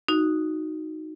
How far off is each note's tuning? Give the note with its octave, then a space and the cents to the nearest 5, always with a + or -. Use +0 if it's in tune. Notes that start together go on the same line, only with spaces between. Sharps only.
D#4 +0 F#4 -5